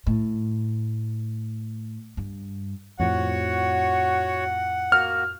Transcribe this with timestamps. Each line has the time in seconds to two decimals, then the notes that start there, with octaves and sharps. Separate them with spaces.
0.07 A2
2.17 G2
3.00 F2 A2 F3 F#4 C#5 F#5
4.92 A#3 F#4 F6